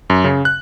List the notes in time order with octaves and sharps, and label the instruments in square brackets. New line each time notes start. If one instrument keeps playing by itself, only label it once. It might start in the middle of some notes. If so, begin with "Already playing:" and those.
[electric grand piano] F#2
C#3
F#6